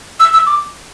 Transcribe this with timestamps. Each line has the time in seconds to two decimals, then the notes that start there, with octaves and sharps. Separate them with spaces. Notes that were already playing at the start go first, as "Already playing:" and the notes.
0.20 E6
0.33 E6
0.47 D6